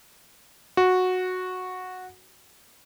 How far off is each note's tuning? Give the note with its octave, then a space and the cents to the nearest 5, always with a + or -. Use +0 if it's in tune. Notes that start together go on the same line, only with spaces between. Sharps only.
F#4 -10